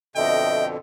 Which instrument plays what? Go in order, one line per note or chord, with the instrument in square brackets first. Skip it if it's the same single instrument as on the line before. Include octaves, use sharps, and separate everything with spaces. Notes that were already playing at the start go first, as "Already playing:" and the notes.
[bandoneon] F2 B2 D3 [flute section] D#5 [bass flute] E5 [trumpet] G5